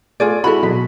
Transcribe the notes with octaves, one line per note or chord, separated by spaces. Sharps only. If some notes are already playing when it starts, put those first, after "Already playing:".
A3 F4 G#4 D5
G#3 E4 F#4 A4 B5
B2 F#3 B6